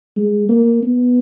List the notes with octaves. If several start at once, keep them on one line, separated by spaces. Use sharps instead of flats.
G#3
A#3
B3